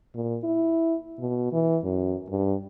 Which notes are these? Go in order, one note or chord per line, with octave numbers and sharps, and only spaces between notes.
A#2
E4
B2
E3
F#2
G2